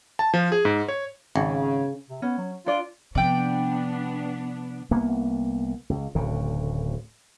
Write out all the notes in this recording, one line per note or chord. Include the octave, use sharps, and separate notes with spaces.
A5
F3
G#4
G#2
C#5
G#1 C#3
C3
B3 C#4
F#3
D4 F4 D5
C3 F3 B3 D4 D5 G5
C2 A#3 B3
C#2
D1 D2 C#3